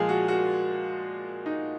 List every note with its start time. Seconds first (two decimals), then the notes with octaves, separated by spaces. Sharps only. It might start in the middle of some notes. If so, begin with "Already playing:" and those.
Already playing: A#2 F3 G#3 G#4
0.09 F#4
0.28 F#4
1.46 D#4